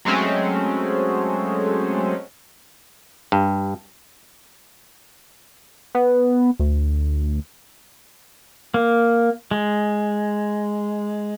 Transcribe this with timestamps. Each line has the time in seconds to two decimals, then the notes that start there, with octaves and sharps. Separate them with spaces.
0.05 F#3 G#3 A3 C4 C#4
3.32 G2
5.95 B3
6.60 D2
8.74 A#3
9.51 G#3